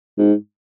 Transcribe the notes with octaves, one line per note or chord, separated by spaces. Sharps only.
G#2